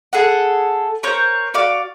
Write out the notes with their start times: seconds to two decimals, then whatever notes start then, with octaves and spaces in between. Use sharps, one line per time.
0.13 G#4 A4 F#5
1.03 A#4 C5 C#5 G6
1.54 F#4 D5 F5 D6